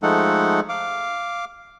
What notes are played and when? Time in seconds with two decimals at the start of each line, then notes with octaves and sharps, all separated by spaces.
0.03 F3 G#3 A3 D#4 A4 F#5
0.69 F5 D6